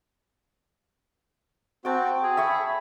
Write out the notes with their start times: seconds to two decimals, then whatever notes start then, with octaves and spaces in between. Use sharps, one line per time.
1.85 C4 F#4 G5 A5
2.23 G#4
2.37 E5 B5 C#6